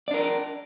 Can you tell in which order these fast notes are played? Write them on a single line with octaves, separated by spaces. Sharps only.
D5 D4 A#4